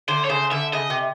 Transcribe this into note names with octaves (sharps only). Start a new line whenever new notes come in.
D3 C5
C#5
C#3 C5
D3 E5
C#3 D#5
C3